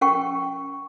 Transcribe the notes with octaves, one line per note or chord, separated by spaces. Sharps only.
C#4 A#4 F#5 G5 C#6